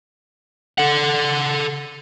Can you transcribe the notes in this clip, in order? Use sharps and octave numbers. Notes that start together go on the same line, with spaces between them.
A4 F#5